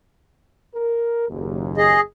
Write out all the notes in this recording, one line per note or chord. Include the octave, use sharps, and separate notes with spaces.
A#4
F#1 D#2
G#4 D#5